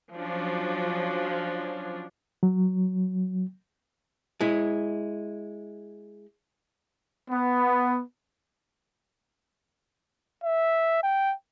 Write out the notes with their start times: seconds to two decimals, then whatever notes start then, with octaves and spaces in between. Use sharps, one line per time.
0.13 F3 F#3 C#4 D4
2.43 F#3
4.41 G#3 E4
7.31 B3
10.44 E5
11.03 G5